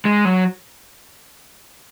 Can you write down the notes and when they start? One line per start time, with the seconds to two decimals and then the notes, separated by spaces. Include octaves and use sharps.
0.05 G#3
0.25 F#3